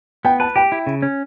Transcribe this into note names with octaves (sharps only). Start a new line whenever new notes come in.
B3 G5
B4 A5
G4 G5
E4
C#3
C#4